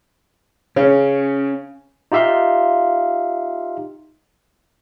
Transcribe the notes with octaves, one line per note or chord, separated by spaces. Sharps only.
C#3 C#4 C#5
D#4 F4 G4 E5 F5 C6